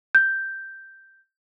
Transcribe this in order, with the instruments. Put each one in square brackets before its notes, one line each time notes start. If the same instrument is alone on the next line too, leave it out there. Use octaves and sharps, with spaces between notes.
[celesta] G6